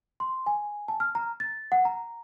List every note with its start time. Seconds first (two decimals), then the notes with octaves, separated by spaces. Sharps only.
0.20 C6
0.46 G#5
0.88 A5
1.00 F6
1.15 A#5
1.40 A6
1.72 F#5
1.85 A#5